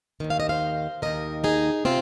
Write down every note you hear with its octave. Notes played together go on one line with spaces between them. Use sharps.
D#2 D#3
F5
D#5
C5 F5
D#2 D#3 A#4 D#5
D#4 G#4
C3 C4 F4